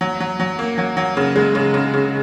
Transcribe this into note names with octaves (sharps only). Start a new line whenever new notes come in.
F#3
F#3
F#3
A#3
F#3
F#3
C#3
G#3
C#3
C#3
C#3